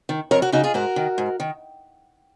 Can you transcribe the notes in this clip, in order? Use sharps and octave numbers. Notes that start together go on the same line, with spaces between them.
D#3
F2 A#4 C#5
F#4 A#4
C#3 D#4 F#4
F4 G#4
G#2 F#4 A#4
D#3
G#2
D#3